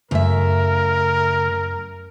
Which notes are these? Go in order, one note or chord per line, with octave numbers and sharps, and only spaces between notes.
F#2 C#3 A3 A#4 E5